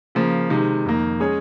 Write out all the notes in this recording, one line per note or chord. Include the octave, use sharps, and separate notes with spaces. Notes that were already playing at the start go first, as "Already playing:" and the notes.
C#3 F3 A#3
C3 D#3 G#3
F2 D#3 A#3
G#3 C#4 G#4 C#5